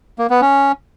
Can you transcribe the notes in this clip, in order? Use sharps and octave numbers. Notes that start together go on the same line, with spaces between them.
A#3
B3
C#4